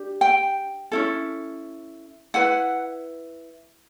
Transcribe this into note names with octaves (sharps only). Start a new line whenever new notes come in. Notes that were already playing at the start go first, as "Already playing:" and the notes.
Already playing: D4 G4
G5
C#4 E4 A4
E4 B4 F#5